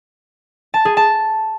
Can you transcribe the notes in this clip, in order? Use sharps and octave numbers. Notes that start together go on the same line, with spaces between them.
A5
G#4
A5